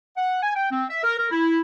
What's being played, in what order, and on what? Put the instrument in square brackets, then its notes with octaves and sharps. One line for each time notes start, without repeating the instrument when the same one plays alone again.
[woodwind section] F#5
G#5
G5
C4
E5
A#4
A#4
E4